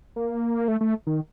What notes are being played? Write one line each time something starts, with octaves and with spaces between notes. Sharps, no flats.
A#3
A3
A3
D#3